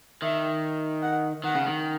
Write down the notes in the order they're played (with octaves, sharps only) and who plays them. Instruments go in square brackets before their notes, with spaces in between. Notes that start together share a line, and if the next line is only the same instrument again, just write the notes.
[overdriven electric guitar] D#3 [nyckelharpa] E5
[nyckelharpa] F#5
[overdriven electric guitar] D#3 [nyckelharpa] F#5
[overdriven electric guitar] C#3
D#3